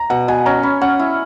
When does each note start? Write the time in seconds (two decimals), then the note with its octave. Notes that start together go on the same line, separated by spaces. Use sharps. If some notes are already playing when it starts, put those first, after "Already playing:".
Already playing: A#5
0.10 B2 F#5
0.28 B2 G#5
0.46 C#4 A#5
0.63 C#4 B5
0.81 C#4 F#5
0.99 E4